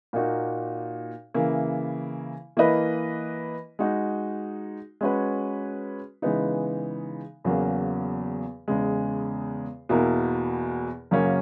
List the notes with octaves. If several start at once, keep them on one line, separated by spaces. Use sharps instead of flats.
A#2 A#3 D#4 F#4
C#3 E3 A#3 E4
E3 A#3 E4 B4 D#5
G#3 D#4 F#4
G#3 C#4 F#4 B4
C#3 E3 G#3 B3 D#4
E2 C#3 F#3 A#3
E2 C#3 G#3
E2 B2 A#3 E4 A#4
F#2 C#3 F#3 A#3 C#4